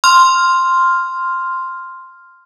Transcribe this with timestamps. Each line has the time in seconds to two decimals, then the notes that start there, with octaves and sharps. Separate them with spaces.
0.04 C6 F6